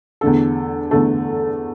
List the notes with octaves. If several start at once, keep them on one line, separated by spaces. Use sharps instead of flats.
E2 D3 A3 A4
E2 D3 A3 A4